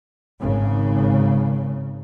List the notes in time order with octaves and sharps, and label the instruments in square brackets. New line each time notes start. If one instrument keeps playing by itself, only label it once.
[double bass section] G#1 C#3